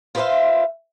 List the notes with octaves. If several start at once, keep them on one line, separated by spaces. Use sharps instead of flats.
F4 B4 C5 D5 E5 F5